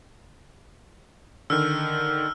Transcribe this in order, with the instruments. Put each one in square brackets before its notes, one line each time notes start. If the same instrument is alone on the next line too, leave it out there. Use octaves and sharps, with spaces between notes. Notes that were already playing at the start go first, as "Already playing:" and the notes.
[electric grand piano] D3 D#3 [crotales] E6 F6